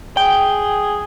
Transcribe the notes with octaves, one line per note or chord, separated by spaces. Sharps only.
G#4 G5